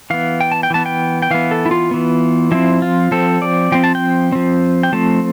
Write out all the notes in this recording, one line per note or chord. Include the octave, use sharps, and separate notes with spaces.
E3 B3 F5
G5
A5
G5
E3 B3 A5
G5
G5
E3 B3 F5
A4
E4
F4
E3 B3
F3 C4 E4
F4
F3 C4 A4
D5
F3 C4 G5
A5
G5
F3 C4
G5
F3 A3 C4 A5